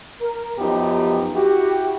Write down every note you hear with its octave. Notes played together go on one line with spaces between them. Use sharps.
A#4
F#2 F3 B3 D#4 G4
E4 F#4 G4